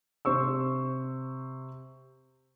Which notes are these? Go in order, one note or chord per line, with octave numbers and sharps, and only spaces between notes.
C3 C5 C#6 E6